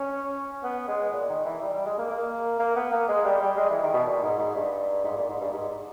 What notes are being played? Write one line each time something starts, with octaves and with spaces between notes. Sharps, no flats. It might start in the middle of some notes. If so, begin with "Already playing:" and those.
Already playing: C#4
B3
G#3
A#2
D#3
E3
G3
G3
G#3
A#3
A#3
A#3
B3
A#3
G#3
G3
G3
G#3
E3
D#3
B2
A#2
G#2
G#2
G2
G#2
A#2
G#2
G2
G#2